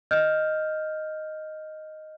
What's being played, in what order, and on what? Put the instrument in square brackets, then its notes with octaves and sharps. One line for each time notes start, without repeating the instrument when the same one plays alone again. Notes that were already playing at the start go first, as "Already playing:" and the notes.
[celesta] D#5 F6 G6